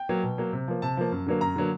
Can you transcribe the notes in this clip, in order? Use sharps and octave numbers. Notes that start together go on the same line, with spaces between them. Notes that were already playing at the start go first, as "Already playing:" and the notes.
Already playing: G5
F#3 A#3
B2
F#3 A#3
C3
F3 A#3
C3 A5
F3 A#3
F#2
D3 F#3 A#3
F#2 A#5
D3 F#3 A#3